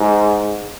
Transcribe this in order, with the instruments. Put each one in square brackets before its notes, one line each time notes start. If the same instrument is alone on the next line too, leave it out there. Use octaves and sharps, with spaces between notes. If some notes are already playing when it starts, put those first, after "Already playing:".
Already playing: [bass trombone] G#2